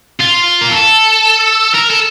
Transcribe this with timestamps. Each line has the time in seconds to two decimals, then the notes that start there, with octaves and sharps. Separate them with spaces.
0.20 F4
0.61 A#4
0.71 A4
1.75 A#4
1.91 A4